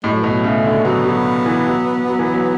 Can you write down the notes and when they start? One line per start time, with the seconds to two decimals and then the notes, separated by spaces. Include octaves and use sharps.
0.03 A2 G#3
0.12 F#3
0.21 B2 E3
0.30 F#3
0.44 C#3 A3
0.65 D3
0.84 F#3 B3
1.05 F#3
1.46 E3
1.66 F#3
2.07 F#3
2.19 E3
2.32 F#3